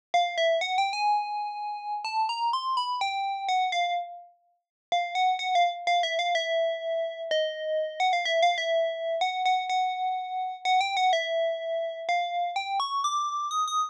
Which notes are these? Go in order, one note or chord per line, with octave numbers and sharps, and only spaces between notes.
F5
E5
F#5
G5
G#5
A5
A#5
C6
B5
G5
F#5
F5
F5
F#5
F#5
F5
F5
E5
F5
E5
D#5
F#5
F5
E5
F5
E5
F#5
F#5
F#5
F#5
G5
F#5
E5
F5
G5
C#6
D6
D#6
D#6